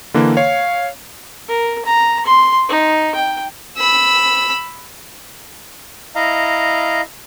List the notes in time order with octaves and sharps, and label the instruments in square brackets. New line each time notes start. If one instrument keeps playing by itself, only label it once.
[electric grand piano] D3 E3 A#3
[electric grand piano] C#5 [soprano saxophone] F5
[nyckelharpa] A#4
A#5
C6
D#4
G5
[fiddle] B5 E6
[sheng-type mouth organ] E4 D#5 F5 A#5